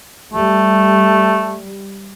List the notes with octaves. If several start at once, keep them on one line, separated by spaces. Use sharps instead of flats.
G3 A3